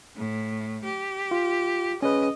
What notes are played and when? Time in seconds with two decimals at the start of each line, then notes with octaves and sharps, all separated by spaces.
0.16 A2
0.84 G4
1.31 F4
2.02 C#4 G#4 B4 D#5